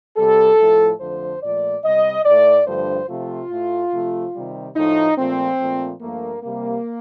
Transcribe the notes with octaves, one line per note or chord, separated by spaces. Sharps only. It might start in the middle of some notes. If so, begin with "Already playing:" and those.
C3 G3 A4
A2 F3 A3
F2 D3 F3 A3 C5
A#2 F3 A3 D5
C3 G3 D#5
A2 A3 D5
G2 D3 F3 A3 C5
C3 F3 A3 F4
A2 A3
C3 F3 A3
C3 D#3 G3
A2 F3 A3 D#4
A#2 F3 A3 C4
A#2 F3 A3
G2 F3 A3 A#3
C3 G3 A#3